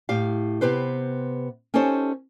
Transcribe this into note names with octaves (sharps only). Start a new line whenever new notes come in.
A2 G4 F5
C3 B3 G4 B4 C5
C#4 D#4 G4 A4 C5 C#5